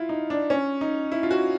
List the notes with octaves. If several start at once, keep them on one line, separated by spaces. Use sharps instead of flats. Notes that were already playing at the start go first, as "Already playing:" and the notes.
Already playing: E4 F4
D#4
D4
C#4
D#4
E4
F4
F#4